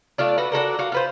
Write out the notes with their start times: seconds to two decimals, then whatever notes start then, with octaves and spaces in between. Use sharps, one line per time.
0.18 A3 D4 F4 D5
0.38 F#4 A4 B4
0.52 D4 F#4 A4 A#4
0.79 F#4 F5
0.92 F4 B4 C5